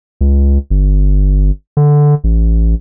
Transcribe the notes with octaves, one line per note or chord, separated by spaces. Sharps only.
C#2
G1
D3
A1